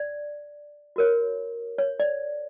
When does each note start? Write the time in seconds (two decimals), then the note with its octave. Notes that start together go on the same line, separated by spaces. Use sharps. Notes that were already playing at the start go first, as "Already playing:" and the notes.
Already playing: D5
0.96 F#4 A#4 C#5
1.78 C#5
2.00 D5